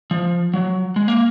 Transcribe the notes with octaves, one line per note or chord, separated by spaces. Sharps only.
F3
F#3
G#3
A#3